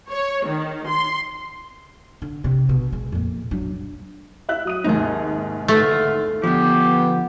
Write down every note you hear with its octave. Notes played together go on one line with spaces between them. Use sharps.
C#5
D#3
C6
D3
C3
B2
G#3
F2 A#2
F#3 D4
E4 E5 F#6
F#3 D#6 D#7
D#2 G#2 C3 D#4 G#4
E2 D3 A3 F4
D3 F3 B3 G4